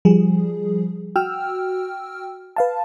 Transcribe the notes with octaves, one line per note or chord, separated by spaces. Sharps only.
F3 G3 G#4
F#4 G5 E6 F6
B4 F5 A5